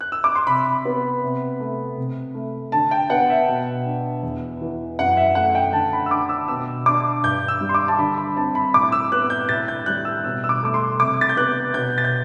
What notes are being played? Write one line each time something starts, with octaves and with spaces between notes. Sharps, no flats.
F#6
E6
D6
C6
C3 B5
B3
C3
A3
C3
A3
D3 A5
G5
B3 F#5
E5
B2
D4
E2
E3
F#2 F#5
E5
A3 F#5
G5
D3 A5
B5
E6
D4 D6
E6
B2 E6
D4 D6
G2 G6
E6
G3
C6
D6
A5
D3 B5
B5
C4 A5
B5
A2 D6
E6
B3 F#6
G6
A2 A6
G6
G3 F#6
E6
B2 E6
E6
D6
A3 D6
C6
C3 D6
A6
G6
B3 F#6
B2 G6
A6
G6